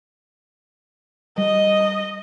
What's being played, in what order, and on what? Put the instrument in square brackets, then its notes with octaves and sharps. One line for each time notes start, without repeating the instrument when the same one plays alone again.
[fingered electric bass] G3 [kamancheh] D#5